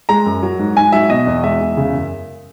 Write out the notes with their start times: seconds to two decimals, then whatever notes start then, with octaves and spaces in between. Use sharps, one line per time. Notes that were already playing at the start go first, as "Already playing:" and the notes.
0.09 G#3 A#5
0.26 F#2
0.43 F#3
0.59 G#2
0.76 G#2 G#5
0.92 F#3 E5
1.10 B2 D#5
1.27 E2
1.43 G#3 E5
1.61 E2
1.77 C#3
1.94 F#2